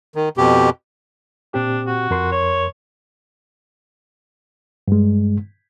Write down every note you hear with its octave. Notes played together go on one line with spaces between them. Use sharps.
D#3
F2 B2 G4
A#2 C4 D4 G4
F#4
F2 A#4 C6
C#5
G2 G#3